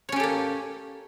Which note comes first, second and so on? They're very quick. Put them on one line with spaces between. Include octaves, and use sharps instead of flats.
C#5 C#4 G4 A4 A#3